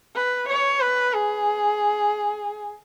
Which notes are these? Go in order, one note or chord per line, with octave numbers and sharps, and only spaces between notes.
B4
C#5
B4
G#4